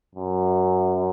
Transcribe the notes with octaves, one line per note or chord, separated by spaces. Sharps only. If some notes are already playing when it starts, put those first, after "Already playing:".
F#2